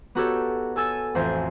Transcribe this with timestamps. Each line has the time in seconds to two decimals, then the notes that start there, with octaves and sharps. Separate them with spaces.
0.15 B3 D#4 F#4 G4 A4 C#5
0.76 A4 G#5 E6 A6 D#7
1.15 A1 F2 C5 F5 G#5 A#6